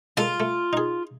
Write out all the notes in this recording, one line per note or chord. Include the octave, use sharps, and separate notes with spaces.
G#3 A#3 F4 A4
A3
D#4 G#4